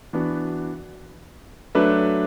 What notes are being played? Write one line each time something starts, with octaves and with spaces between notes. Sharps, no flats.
E3 B3 D4 F#4
F#3 A3 D4 B4